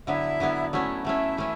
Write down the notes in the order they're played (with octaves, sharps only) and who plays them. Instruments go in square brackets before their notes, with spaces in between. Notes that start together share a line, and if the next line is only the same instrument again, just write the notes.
[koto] D3 F#3 B3 [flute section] E4 E5
[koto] D3 F#3 B3
[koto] F#3 A3 C#4 [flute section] E4 E5
[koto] F#3 A3 C#4 [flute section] E4 E5
[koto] E3 A3 C#4